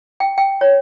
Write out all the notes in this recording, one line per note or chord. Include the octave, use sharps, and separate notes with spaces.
G5
G5
C#5